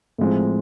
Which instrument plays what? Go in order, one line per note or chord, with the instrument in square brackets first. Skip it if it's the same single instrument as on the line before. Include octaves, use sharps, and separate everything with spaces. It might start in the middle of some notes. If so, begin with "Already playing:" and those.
[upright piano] A2 F3 G#3 C4